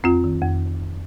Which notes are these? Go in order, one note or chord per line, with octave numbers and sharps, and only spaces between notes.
F2 C4 F4
D#3
F2